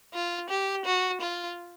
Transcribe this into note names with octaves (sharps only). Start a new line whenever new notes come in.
F4
G4
F#4
F4